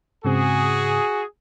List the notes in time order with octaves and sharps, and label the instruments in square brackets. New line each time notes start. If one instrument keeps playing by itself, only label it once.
[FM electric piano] G#2 C#3 C4 [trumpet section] F#4 G#4